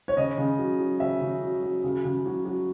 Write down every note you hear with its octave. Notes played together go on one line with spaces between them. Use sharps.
C#5
C#3 D#5
C#3
F#3
F#3
C#3 E5
C#3
F#3
F#3
C#3
C#3
F#3
F#3